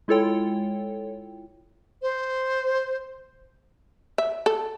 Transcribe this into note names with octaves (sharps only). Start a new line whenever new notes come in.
G#3 E4 F4 A4 C#5 G5
C5
E5
A4